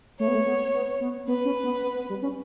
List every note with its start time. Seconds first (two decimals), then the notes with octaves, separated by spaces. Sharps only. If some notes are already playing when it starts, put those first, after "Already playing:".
0.20 A3 C#5
0.28 B3
0.35 A3
0.47 B3
0.74 B3
1.00 B3
1.28 B3 B4
1.45 C#4
1.64 B3
1.82 B3
1.95 B3
2.09 G3
2.22 C#4